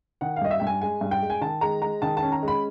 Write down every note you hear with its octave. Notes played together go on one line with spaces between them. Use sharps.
D#3 F#5
F5
G2 D#5
E5
G2 G5
G#5
G#3 G#5
G2
G5
G#3
G#5
D#3 A5
G#3 A#5
G#3 A#5
D#3 A5
A5
C#4
A#5
G#3
B5